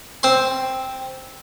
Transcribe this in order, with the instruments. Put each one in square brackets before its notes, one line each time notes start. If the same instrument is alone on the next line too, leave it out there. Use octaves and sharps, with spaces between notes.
[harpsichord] C4 C6